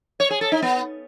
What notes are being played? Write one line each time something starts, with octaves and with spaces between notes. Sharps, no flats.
C#5
G#4
A4
D#4
B3